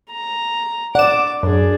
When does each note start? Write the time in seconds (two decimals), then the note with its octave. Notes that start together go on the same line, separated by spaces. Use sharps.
0.10 A#5
0.95 D5 F#5 D6 E7
1.43 F#2 D4 G#4